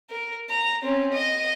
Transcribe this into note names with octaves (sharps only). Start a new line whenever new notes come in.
A#4
A#5
C4 C#4
D#5